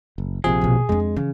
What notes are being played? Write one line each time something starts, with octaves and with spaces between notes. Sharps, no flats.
F#1
A#1 C3 F3 G#4
D#2 B2
F2 G#3 D4
C#3 E3